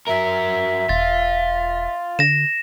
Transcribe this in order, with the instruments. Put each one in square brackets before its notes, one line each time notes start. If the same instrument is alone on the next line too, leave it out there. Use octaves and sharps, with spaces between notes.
[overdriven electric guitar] F#3 A#4 [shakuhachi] E5
[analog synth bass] E1 [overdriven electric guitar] F4 [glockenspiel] A6
[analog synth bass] D3 [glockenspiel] A#6 E7